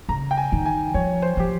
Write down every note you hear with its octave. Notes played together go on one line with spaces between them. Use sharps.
C#3 A#5
G5
G#5
D#3
G#5
F3 C#5
C5
F3 G4